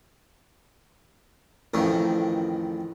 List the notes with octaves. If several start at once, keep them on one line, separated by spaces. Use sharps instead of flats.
A1 F2 D#3